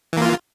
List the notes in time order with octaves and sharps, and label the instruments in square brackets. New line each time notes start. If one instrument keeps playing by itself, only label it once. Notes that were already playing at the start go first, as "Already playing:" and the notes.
[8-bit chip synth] E3
A#3
F4